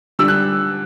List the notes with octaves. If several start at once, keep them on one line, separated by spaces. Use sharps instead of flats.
D3 G3 E6
F#6